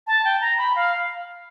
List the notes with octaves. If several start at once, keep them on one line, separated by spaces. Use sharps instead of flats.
A5
G5
A#5
B5
F5